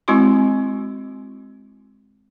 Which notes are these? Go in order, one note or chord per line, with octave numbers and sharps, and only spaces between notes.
G#3 C4 E4 F#4 C6 C#6